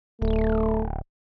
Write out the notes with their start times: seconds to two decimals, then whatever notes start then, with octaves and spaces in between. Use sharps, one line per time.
0.22 D1 A3